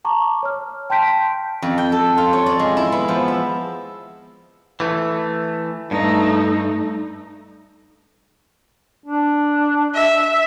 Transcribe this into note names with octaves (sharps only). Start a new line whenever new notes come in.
A5 A#5 C#6 D6
C#5 F6
G5 A5 C6 G6 B6 D7
F2
G5
A4
F4
C#5
D5
G#3
E4
B3
F3
E5
E3 A3
G2 A3 D#4
D4
E5